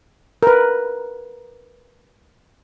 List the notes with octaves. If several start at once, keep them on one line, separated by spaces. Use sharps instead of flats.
A#4 B4